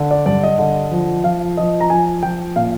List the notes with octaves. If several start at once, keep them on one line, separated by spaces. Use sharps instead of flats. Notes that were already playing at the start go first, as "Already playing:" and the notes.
Already playing: D3
D5
G2 D5
D#5
D3
F3
F3 F5
F3 D#5
A#5
F3 G#5
F3 G5
A#2 F5